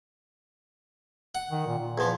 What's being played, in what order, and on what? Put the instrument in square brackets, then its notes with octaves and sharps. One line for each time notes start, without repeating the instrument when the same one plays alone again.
[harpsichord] F#5
[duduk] D#3
A#2
A#2
[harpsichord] E2 F3